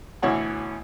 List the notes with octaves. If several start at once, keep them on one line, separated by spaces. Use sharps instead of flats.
D2 B2 E3 C#5 F#5 G#5